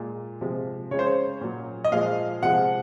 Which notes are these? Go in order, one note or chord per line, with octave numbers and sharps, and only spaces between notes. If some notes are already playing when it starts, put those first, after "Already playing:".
Already playing: A#2 G#3
C3 F3 G#3
C#3 G#3 C#5
C5
C#5
A#2 F#3
D#5
A#2 F3 G#3 F5
C3 F3 G#3 F#5